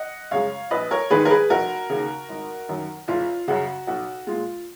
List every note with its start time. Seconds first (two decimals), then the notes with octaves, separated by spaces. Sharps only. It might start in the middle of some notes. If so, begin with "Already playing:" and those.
Already playing: D#5 F#5
0.31 F#2 C#3 G#3 C#5 F5
0.71 A#1 B4 D#5
0.91 A#4 C#5
1.10 G#2 D#3 G#3 G#4 B4
1.25 A#4
1.30 G#4 B4
1.50 F1 F#4 A#4
1.90 D#2 C#3
2.29 G#1
2.69 F#2 D#3 F#3
3.08 F#1 F4
3.48 F#2 C#3 F#4
3.87 B1 F#4
4.27 A#2 G#3 F4